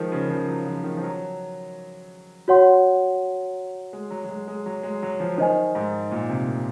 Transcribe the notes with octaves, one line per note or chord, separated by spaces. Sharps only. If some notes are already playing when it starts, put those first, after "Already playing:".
Already playing: D#3 F3 G#3 A#4
C#3
F3
F#3
F3
D#3
F3
F#3
F#4 C#5 F#5 C6
G#3
F#3
F#3
G#3
G#3
F#3
G#3
F#3
F3
D#3 C5 D#5 G#5
G#2
A#2
C3
A#2